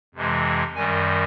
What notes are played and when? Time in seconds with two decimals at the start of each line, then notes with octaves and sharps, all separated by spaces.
0.14 F2 C3 E3 G#3
0.76 F#2 D#3 G3 G#5